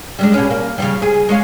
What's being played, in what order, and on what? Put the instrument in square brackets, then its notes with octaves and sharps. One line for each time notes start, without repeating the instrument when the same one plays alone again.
[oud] G3 G#3 D4
B2 C#4
A#3
C#3 F3 G3
G#4
G#3 C#4 F5